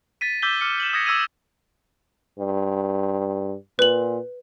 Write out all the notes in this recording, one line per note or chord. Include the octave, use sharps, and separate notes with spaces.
A6 B6 D#7
D6 E6 G6 B6 G7
D6 F6 C#7 G7
E7 F#7
D#6 G#6 A#6 C#7
D6 E6 G#6 D#7
G2
A#2 B4 F#7